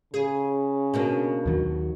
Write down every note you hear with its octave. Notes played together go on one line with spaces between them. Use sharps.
C#3 G#4
B2 A#3 D4
D#2 D#3 F#3